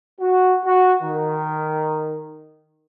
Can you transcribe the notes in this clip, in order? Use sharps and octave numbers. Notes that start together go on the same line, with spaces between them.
F#4
F#4
D#3